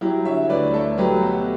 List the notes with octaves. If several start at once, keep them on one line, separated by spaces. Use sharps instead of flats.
F#3 E4 G4
D3 C#5 E5
D2 B4 D5
A3 A4 C#5
F#3 G4 B4
B2 F#4 A4